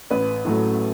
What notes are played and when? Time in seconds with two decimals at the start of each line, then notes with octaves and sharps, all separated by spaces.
0.10 A1 B4
0.45 A2 F#3 A3